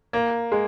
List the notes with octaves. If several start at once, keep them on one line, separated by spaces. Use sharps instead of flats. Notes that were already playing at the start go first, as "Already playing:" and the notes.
A#3
G#3